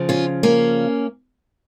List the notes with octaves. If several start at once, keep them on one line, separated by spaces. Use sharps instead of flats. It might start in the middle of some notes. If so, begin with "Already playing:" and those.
Already playing: C#3 F3
C#4 F4
A#3 C#4